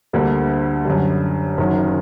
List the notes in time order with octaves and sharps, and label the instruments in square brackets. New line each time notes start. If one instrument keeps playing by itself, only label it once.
[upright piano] D2 D3 G3 A#3
F#2 D3 G3
F#1 F#2 D#3 F#3